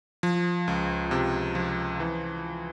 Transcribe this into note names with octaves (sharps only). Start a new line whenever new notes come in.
F3
C#2
C3
F3
E3